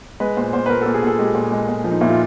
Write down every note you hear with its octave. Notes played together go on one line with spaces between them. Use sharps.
G#3 B4
A#2 C5
A#2 C5
B4
A#2 A#4
A#2 A4
G#4
A#2 A4
G#3 G4
A#2
G#3
A#2
F3
D#4
A#2 E4
F4